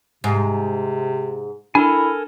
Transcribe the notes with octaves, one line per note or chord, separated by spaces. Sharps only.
G#2 C3
D4 E4 A4 A#4 G#5